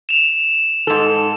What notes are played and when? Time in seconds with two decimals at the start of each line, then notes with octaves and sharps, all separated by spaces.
0.09 E7 F7
0.87 G#2 A4